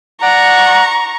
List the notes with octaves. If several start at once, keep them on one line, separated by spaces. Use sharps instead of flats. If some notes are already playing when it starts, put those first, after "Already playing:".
D5 F#5 A#5 C#6